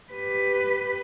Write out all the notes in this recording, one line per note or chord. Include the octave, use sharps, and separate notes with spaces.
G4 B4